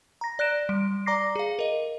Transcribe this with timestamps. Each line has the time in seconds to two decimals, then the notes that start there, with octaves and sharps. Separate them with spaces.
0.21 A#5 A#6
0.39 D5 F#6 A#6 D7 E7
0.69 G3 D7
1.06 D5 A#5 D6 A#6 C7
1.36 G#4 F5
1.59 A#4 D#5